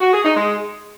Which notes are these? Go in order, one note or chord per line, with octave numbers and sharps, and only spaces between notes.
F#4
G#4
D#4
G#3